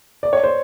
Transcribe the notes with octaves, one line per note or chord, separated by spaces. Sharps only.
D5
C#5
C5